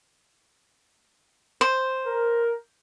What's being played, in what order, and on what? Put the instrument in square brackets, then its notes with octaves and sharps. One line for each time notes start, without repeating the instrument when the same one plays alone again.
[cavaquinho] C5
[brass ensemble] A#4